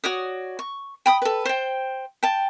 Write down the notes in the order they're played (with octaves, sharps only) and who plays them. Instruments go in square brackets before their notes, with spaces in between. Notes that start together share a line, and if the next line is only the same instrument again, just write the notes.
[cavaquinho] F#4 C#5 D5 D#6
C#6
G5 B5 D#6
A4 B4
C5 G5
G5 A5